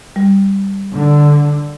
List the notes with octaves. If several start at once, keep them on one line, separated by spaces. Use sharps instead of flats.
G3
D3